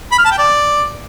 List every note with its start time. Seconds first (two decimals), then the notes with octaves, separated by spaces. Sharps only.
0.12 B5
0.18 F6
0.25 A5
0.32 G5
0.38 D5